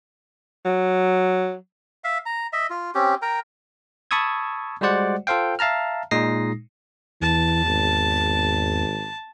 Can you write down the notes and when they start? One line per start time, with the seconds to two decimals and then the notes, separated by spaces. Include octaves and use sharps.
0.65 F#3
2.04 E5 F5
2.26 A#5
2.53 D#5 E5
2.70 F4
2.95 C4 C#4 G4
3.22 A#4 G5 A#5
4.11 A5 B5 C#6 D#6 E6 G#6
4.81 G3 G#3 F#4 C5 D5 F#5
5.27 F4 A4 C5 F5 G5
5.59 E5 F5 A5 A#5 F6
6.11 A#2 G#3 D#4 D#6 A#6 C7
7.22 E2 E3 A5
7.66 G#1